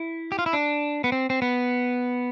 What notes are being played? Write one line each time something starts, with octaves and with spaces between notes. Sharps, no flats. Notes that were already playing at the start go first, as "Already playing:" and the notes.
Already playing: E4
G4
F4
E4
D4
B3
C4
C4
B3